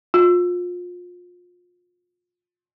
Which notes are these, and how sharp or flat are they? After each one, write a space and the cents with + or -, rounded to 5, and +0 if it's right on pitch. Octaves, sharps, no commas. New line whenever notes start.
F4 +30